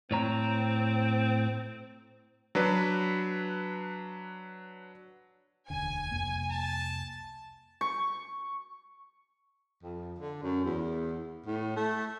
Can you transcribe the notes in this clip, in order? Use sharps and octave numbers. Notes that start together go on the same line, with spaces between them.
A2 C4 C#5 A#5
F#3 D4 B4
E1 D2 D3 G#5
C2 F2 A#3
A5
C#6
F2
D3
F#2
E2
A2
A3